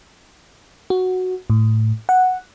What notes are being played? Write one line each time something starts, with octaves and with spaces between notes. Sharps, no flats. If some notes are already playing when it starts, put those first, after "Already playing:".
F#4
A2
F#5